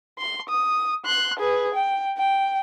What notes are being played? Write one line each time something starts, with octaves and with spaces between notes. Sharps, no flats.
C6
D#6
C6 F#6
G#4 B4
G5
G5